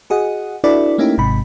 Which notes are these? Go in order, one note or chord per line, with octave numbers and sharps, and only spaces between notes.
F#4 G#4 D#5 F#5
D4 E4 F#4 A4 B4 D5
A3 A#3 C#4 D#4 E4 G4
G#1 G#2 C3 B5